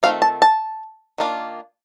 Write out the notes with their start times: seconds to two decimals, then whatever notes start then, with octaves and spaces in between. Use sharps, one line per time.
0.03 D#3 A3 C4 F4 F5
0.22 A5
0.42 A5
1.18 D#3 A#3 D4 F4